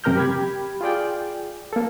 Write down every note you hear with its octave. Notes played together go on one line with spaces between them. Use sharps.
F#2 C3 A#4 A#5 F6 G6
G4 B5 G#6
F4 G#4 D5 G5
A#3 A4